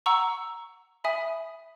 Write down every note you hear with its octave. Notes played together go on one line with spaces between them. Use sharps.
F#5 A#5 C#6 E6
E5 G#5 B5 D#6